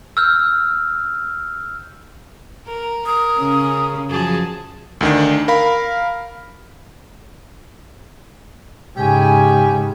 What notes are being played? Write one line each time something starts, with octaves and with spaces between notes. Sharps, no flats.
E6 F6 G6
A#4
A#4 D#6
C#3 C#4
F#2 F3 G#4 A5
D2 D#3 D4
A#4 F5 B5
G#2 C#3 G4 G#5